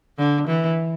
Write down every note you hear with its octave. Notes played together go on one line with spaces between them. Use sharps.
D3
E3